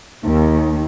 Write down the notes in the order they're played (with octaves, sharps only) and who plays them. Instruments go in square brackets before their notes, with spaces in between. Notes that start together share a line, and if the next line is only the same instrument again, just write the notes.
[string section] D#2 [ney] D#4